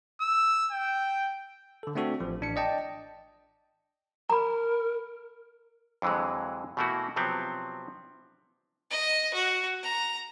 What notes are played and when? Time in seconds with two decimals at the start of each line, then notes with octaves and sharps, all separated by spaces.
0.21 E6
0.72 G5
1.83 D3 A4
1.95 A3 C4 D4 F#4 A4
2.20 A1 F3
2.41 A1 D4 C#7
2.56 D5 D#5 G5 A5
4.30 A#4 A#5 B5
6.02 F2 D3 E3 F#3 G#3
6.77 B2 E3 A3 A#3 E4 F#4
7.16 C3 F3 F#3 B3 C4
8.91 D#5
9.34 F#4
9.83 A#5